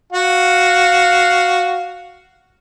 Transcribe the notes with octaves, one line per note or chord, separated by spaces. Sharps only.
F#4 F5